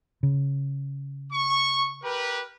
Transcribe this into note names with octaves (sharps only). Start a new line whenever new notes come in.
C#3
C#6
G4 A#4 B4